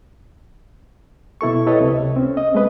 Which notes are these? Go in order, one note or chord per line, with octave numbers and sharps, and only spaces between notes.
B2 E4 A4 C#6
E4 G4 A4 B4 C#5 D#5
C#2 C3
C4 C#4
D#5
G#3 A3 B4 D#5